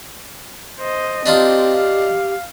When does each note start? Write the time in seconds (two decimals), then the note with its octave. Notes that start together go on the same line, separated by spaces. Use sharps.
0.79 C5 D#5
1.26 C4 D4 D#4 F4 G4
1.74 F5